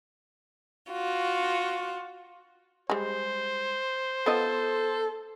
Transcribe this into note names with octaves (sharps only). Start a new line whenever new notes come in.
F4 F#4
G3 G#3 C5
B3 F4 A4 D#5